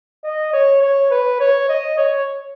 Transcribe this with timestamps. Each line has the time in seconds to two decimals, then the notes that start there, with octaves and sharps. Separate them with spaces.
0.24 D#5
0.53 C#5
0.82 C#5
1.11 B4
1.40 C#5
1.69 D#5
1.98 C#5